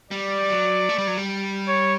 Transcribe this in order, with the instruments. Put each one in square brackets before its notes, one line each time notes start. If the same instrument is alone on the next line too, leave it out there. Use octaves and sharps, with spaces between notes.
[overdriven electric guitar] G3 [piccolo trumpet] D5
[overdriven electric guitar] F#3
A3
G3
F#3
G3
[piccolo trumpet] C#5